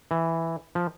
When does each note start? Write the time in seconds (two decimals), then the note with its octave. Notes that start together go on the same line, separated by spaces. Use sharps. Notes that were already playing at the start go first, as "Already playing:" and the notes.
0.11 E3
0.75 F3